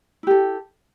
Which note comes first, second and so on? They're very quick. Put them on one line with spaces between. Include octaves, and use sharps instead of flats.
E4 G4 A4